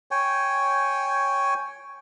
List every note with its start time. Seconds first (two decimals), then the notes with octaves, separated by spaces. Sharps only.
0.11 C#5 G5 G#5